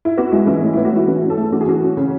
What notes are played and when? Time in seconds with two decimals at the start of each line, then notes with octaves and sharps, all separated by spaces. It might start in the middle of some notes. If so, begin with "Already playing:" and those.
0.05 E4
0.17 B3 F#4
0.32 G#3 E4
0.47 E3 E4
0.62 A2
0.73 B3 E4
0.85 F#4
0.92 G#3 E4
1.07 E3 F#4
1.22 C#4
1.30 A4
1.37 A3 G#4
1.52 E3 F#4
1.61 G#4
1.68 E3 F#4
1.83 C#4
1.97 C#3